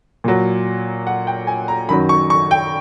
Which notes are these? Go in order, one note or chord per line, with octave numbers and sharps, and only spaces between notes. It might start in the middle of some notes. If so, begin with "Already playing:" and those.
A#2 F#3
F#5
G5
G#5
A#5
F#2 D#3 F#3 B5
C#6
C#6
G5